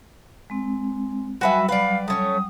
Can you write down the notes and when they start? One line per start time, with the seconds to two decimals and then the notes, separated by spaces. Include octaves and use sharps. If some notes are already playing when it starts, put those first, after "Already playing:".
0.50 G#3 C4
1.41 F#3 G3 F#4 B4 E5 G#5
1.69 B4 D5 F5
2.08 A3 C#4 C#5 D#6